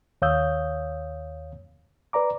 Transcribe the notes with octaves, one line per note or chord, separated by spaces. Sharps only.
D#2 C#5 F5 D#6 E6 G6
B4 D5 A#5 D6